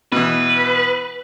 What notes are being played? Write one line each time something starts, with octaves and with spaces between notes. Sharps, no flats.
B2 E3 B4